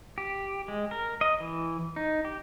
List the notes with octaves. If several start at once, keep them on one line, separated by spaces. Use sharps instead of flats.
G4
G#3
A#4
D#5
E3
D#4
G4